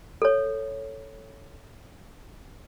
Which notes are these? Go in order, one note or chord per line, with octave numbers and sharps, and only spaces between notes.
A4 C#5